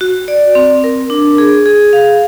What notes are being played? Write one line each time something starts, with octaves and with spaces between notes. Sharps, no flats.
F#4
D5
C4
A#4
D4
G#4
G#4
F5